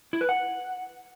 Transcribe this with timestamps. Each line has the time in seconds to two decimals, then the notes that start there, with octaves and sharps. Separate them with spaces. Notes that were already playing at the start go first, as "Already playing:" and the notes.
0.13 E4
0.21 B4
0.29 F#5